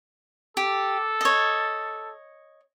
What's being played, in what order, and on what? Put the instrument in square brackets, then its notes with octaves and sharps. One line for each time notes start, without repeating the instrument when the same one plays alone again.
[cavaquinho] G4 [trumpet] A4
[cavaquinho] C#5 D#5